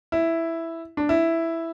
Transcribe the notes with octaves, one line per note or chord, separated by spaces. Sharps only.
E4
D4
E4